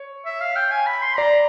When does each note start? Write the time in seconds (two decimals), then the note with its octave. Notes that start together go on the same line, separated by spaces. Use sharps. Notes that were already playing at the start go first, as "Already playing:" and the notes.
Already playing: C#5
0.26 E5
0.41 F5
0.56 G5
0.71 G#5
0.87 B5
1.02 C6
1.18 D5 A#5